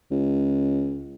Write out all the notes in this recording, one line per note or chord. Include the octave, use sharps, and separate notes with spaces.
C#2